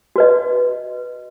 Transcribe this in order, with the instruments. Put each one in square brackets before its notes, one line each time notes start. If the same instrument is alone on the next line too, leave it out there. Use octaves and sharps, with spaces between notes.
[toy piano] F#4 B4 D#5